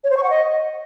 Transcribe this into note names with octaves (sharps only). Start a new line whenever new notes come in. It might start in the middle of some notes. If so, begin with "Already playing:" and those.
C#5
C5
C#6
F#5
D#5